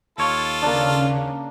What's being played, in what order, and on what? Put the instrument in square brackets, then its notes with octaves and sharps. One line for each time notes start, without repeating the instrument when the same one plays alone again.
[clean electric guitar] D#2 C#5 [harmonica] F4 A4
[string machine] C#3 [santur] A#3 D4